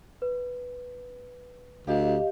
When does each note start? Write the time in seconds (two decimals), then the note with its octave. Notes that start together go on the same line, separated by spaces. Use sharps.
0.22 B4
1.87 D2 G4 D#5 F5